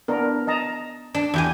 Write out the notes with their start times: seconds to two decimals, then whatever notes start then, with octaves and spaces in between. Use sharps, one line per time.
0.08 B3 D4 A#4
0.47 D#5 A5 A#5
1.14 D4
1.34 E2 G4 G#5